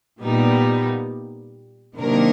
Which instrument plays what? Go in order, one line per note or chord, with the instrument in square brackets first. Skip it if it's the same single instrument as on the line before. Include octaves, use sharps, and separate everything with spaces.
[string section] A#2 G3 B3 D#4
C3 D#3 F#3 A#3 D4 A#4